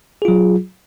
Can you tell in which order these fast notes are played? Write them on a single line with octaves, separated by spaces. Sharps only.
G#4 F4 F#3